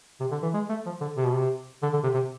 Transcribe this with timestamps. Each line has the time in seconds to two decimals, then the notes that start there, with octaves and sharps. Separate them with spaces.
0.20 C3
0.31 D3
0.42 E3
0.54 G#3
0.69 A3
0.86 F3
1.01 D3
1.17 C3
1.27 B2
1.34 C3
1.83 D3
1.93 D3
2.03 C3
2.14 C3